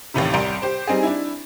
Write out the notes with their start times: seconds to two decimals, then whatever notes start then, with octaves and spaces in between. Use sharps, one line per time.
0.14 A1 D#2 A2 C3
0.34 C2 G4 A#5 C6 D7
0.62 G4 C5
0.87 G3 C4 D#4 G#4
1.03 D4 E4